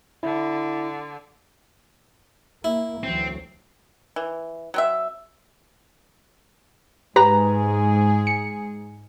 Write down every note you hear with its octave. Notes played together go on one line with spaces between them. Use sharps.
D3 E4
A#3 E4
D2 E3 F#3 C4
E3
F#3 C4 E5
G#2 G4 G#4 B4 A#5
C#7